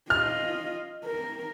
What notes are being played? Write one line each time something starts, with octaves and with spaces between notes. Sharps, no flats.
F4 D#5 F6
A#4